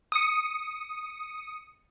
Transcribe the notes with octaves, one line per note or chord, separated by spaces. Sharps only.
D#6 C#7